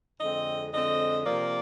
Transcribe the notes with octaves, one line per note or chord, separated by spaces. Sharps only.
F2 D3 G#3 C4 D#5
F2 D3 G#3 C4 D#5
C3 F3 A#3 D5